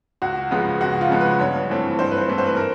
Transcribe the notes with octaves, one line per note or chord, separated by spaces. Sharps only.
C#2 F#4
C#3 F3 G#3 B3
C#2 F#4
F4
C#3 F3 G#3 B3
B4
G2 C#5
E3 A3 C4
G2 C5
B4
C5
E3 A3 C4
C5
B4
A#4